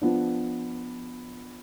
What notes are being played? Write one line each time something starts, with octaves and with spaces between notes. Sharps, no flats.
F3 B3 D4